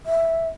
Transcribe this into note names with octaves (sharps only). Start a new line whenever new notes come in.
E5